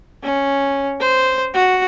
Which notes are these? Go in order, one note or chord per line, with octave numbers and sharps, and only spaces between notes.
C#4
C5
F#4